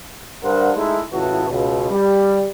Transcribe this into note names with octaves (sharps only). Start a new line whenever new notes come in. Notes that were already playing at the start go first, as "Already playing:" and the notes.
G2 D4 A#4 C5 F#5
G#3 A3 D#4 E4
C#2 A2 E3 B3 F#4 A5
C#2 B2
G3